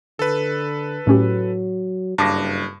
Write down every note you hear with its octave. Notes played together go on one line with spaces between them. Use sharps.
D3 A4 B4
A2 F#3 C#4 G4
F#1 G2 A5 D6 A#6